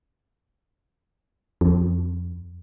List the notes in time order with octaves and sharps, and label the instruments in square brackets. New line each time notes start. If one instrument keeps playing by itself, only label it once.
[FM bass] F2